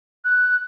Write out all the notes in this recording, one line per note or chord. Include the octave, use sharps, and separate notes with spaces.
F#6